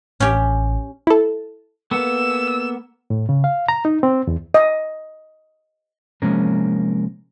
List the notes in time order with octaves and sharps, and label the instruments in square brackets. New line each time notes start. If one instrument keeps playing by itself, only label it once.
[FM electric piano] A1 [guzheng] C#4 G4
[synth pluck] E4 A4
[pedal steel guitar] A#3 B3 A4 [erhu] E6
[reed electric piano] A2
C#3
F5
A#5
D#4
C4
E2
[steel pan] D#5
[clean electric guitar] C3 F3 G#3 A#3 C#4 A#4